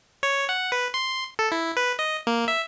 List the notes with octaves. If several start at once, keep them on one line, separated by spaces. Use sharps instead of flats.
C#5
F#5
B4
C6
A4
E4
B4
D#5
A#3
E5